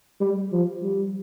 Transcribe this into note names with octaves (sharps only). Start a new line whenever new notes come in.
G3
F3
G3